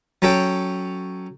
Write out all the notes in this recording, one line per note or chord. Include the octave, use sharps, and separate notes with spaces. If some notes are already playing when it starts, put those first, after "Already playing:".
F#3 C#4 F#4 A4 G5